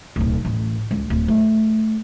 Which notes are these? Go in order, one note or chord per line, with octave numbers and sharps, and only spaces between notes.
D1 B1
A1
C#2
D1
A3